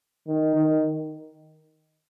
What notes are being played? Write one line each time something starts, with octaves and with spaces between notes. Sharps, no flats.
D#3
D#3